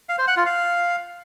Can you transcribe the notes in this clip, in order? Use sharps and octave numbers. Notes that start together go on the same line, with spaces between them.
F5
C5
F#5
F4
F5